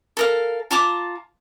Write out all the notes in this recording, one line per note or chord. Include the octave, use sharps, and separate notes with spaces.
A4 A#4 F5
F4 A5 A#5 D6